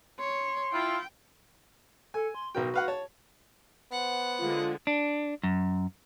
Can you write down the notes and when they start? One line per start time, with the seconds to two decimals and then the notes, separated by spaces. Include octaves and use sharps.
0.19 C#5 C6
0.73 E4 F4 G5
2.14 A4 G#5
2.35 C6
2.55 B1 F#4 A#4 G5
2.74 B4 F5 F#5
2.88 C#5 A5
3.92 B3 C5 F#5
4.40 D3 G#3 F4
4.87 D4
5.43 F#2